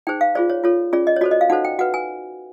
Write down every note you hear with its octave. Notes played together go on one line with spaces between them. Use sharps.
D#4 G#4 C5 G5
F5
F4 G#4 C5 D5
C#5
F4 A4 C#5
C#4 F4 G#4 D5
D#5
C#5
F#4 A4 C5 D5
D#5
F5
D#4 F#4 A4 C5 F#5
G5
F#4 B4 F#5
G#5